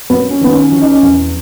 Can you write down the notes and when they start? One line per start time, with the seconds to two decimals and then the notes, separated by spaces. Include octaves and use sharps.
0.10 F#2 B3
0.31 C#4
0.41 D#3 B3
0.52 C#4
0.72 E3 C#4
0.81 D#4
0.90 C#4
1.02 E2